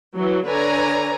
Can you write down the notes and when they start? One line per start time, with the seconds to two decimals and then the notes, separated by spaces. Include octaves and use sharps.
0.16 E3 F#3
0.46 D3 B4 C#5 D5 G#5 A#5